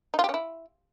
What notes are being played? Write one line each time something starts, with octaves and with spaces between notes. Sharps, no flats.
D#4
F4
G4
C#4
E4